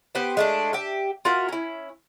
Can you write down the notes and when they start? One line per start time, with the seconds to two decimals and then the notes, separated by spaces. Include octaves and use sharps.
0.15 B3 G4 C5
0.37 G#3 A3 D4
0.73 G4 E5
1.25 F4 F#4 A#4 E5
1.49 C#4 E4